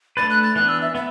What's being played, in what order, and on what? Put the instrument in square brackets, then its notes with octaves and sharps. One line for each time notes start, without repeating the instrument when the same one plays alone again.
[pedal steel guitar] A3 D4 B4 [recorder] A6
[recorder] F#6
A6
[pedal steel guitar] E3 B3 D4 [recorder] F#6
[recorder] E6
E5
[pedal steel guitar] B3 [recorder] E5